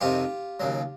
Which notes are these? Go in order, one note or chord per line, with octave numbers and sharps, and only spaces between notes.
F2 C3 D#3 F4 G4
D#2 C#3 F#3